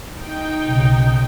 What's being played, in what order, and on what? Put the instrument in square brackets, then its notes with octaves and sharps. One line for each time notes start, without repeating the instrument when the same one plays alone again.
[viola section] D#4 G5
[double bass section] B1 C#3